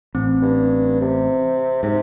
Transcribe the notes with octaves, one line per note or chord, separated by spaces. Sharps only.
A1 C4
G2
C3
G#2 C3